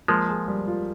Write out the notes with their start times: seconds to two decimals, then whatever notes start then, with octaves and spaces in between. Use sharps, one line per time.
0.08 F3 G#3 A#3
0.28 G#4
0.48 G3
0.68 F4